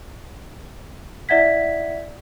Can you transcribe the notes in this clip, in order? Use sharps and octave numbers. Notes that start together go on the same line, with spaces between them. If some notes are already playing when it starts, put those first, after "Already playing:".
E4 D5 E5 F#5 G#6 B6